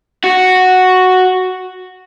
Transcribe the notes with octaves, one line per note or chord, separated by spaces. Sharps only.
F#4